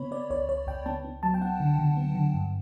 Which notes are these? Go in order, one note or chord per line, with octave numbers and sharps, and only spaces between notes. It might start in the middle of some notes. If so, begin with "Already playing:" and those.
Already playing: C#3 B3 C#5 B5
B3 D5
C#2 C#5
C#2 C#5
C#2 G5
B3 A5
B3
F#3 A5
G5
B3 F#5
D3
D3
B3
D3
G2